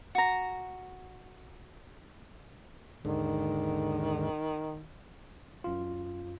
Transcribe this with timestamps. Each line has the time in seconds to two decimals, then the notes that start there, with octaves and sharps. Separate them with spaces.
0.15 F#4 A#5
3.05 D#2 G#2 D3 D#3
5.64 F#2 F4